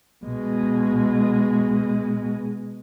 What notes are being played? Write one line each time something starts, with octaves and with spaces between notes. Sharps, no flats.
B2 G#3